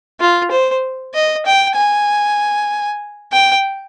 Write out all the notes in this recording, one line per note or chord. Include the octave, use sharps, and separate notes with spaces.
F4
C5
D#5
G5
G#5
G5